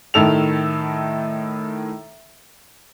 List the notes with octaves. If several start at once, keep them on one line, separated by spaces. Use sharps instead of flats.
A2 D#3 A4 F7